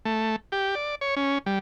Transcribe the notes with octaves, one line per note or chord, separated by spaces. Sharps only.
A3
G4
D5
C#5
C#4
G3